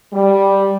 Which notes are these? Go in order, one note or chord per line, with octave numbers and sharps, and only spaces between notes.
G3